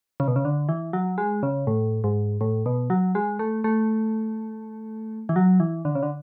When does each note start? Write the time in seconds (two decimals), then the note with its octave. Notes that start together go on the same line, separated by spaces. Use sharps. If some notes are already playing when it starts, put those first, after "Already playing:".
0.20 C#3
0.28 B2
0.36 C#3
0.45 D3
0.69 E3
0.93 F#3
1.18 G#3
1.43 C#3
1.67 A2
2.04 G#2
2.41 A2
2.66 B2
2.90 F#3
3.15 G#3
3.39 A3
3.64 A3
5.29 E3
5.36 F#3
5.60 E3
5.85 D3
5.95 C#3
6.03 D3